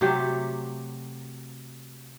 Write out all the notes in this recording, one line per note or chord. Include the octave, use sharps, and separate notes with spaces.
C3 F#3 A3 G4